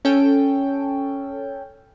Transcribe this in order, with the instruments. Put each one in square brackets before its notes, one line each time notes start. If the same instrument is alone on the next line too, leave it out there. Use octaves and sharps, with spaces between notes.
[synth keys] C#4 A4 G5